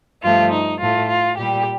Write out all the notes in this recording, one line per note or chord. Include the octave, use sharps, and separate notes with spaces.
G2 F3 A3 F4
D#4
A2 A3 F4
F4
A#2 G3 G4